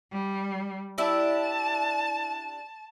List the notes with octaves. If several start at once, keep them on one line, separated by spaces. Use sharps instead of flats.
G3
D4 E4 G4 A5